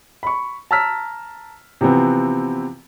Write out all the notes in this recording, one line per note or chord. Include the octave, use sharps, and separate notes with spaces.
B5 C#6
A5 A#5 E6 F6 B6
C3 E3 F3 B3 C4